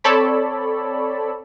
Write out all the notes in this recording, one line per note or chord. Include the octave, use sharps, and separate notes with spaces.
C4 A4 C#5 D5 B5